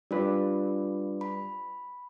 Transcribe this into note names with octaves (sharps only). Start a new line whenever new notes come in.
G3 D4 F4 B4 D5
B5